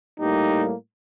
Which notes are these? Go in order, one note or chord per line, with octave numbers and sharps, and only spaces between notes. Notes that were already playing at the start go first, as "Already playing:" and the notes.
A2 G3 A#3 D#4 G4